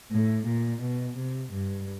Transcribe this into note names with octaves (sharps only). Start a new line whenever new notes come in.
A2
A#2
B2
C3
G2